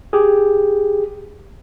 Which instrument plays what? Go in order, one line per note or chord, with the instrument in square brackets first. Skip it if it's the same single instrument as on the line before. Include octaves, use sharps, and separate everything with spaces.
[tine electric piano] G4 G#4